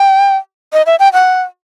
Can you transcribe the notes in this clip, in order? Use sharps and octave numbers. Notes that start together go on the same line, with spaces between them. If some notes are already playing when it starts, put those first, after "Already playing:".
Already playing: G5
D#5
E5
G5
F#5